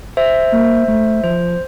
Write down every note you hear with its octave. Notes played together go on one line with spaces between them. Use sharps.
C5 E5
A#3
A3
F3 C5